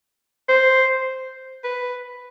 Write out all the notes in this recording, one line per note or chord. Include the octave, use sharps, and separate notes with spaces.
C5
B4